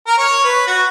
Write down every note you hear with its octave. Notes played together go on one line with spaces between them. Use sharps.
A#4
C#5
B4
F#4